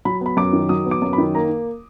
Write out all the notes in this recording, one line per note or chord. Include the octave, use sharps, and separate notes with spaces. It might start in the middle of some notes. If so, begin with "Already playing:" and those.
F#3 B5
B3 B5
F#2 D6
D#3
F#3 D#6
B3
D6
F#2
B5
D#3
A#3 A#5